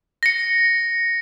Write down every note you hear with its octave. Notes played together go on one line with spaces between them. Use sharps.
A#6 C#7